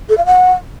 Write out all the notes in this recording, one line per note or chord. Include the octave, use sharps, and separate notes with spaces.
A4
F5
F#5